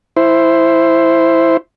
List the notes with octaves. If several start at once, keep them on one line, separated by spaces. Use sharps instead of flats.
E4 C5